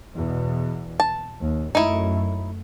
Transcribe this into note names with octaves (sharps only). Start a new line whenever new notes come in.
E2 B2
A5
D#2
F#2 A3 D#4 E4